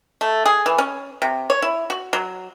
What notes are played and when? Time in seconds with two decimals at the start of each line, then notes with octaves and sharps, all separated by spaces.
0.21 A3
0.46 G#4
0.66 E3
0.78 C#4
1.22 C3
1.50 C#5
1.62 E4
1.90 F#4
2.13 F#3